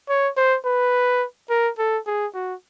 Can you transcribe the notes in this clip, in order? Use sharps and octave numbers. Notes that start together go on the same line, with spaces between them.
C#5
C5
B4
A#4
A4
G#4
F#4